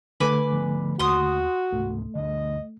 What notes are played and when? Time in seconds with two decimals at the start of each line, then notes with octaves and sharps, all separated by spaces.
0.20 D3 A3 B4 G#5 D6
0.52 F3 B3
0.99 D#2 F#4 C6 D#6
1.73 C#2 G#2 C3 A3
2.15 D2 G2 D3 D#5